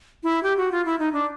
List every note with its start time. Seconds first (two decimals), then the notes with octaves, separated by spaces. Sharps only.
0.23 E4
0.43 G4
0.57 F#4
0.72 F4
0.85 E4
0.99 D#4
1.13 D4